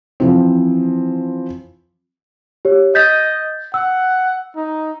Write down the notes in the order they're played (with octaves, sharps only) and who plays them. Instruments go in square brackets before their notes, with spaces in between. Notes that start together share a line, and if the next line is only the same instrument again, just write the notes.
[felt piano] E3 F3 C4
[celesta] G4 C#5
[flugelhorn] D#5 [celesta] G6 A6 B6
[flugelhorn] F#5 [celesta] E6
[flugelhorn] D#4